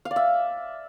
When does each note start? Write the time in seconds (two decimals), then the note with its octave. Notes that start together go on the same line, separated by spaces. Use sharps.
0.05 F5
0.11 D5
0.16 E5